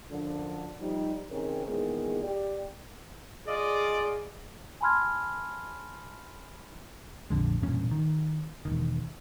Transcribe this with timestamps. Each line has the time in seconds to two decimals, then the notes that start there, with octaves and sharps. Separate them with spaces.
0.10 F#2 D3 F3
0.81 F3 G3 D#4
1.31 C3 D#3 C4 C#4 G#4 A#4
1.67 E2 A#2 D#3 G#3 A#3 G#4
2.23 G4 D5
3.47 F4 G#4 D5 D#5
4.81 G#5 A5 B5 C6 F6 G#6
7.30 A#1 F2 D3 G#3
7.63 E1 G2 A#2 C#4
7.91 D#3
8.65 E1 A#1 D#3